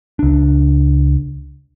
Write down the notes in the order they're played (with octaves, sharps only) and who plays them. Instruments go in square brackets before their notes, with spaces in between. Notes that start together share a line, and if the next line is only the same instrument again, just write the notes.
[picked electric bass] C#2 D4